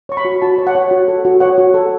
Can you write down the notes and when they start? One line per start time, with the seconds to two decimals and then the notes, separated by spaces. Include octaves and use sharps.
0.09 C#5 C#6
0.17 B5
0.25 F#4
0.42 F#4 A5
0.58 C#5
0.67 F#5
0.75 C#5
0.91 F#4
1.08 A4
1.25 F#4
1.40 C#5 F#5
1.58 F#4
1.74 A4